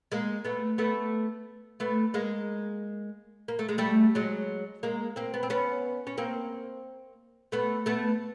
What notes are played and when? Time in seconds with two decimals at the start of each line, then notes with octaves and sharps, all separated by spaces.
0.12 G#3 A#3
0.44 A3 B3
0.78 A3 B3
1.80 A3 B3
2.14 G#3 A#3
3.48 A#3
3.59 A3
3.69 G#3
3.78 G3 A3
4.15 F#3 G#3
4.83 G#3 A#3
5.16 A#3 C4
5.34 B3
5.43 C4
5.50 B3 C#4
6.07 C#4
6.18 A#3 C4
7.52 A3 B3
7.86 A3 B3